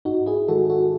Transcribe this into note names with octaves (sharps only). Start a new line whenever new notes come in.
G#2 D#4 F#4
E4 G#4
D#3 G#3 F#4 A4
F#4 A4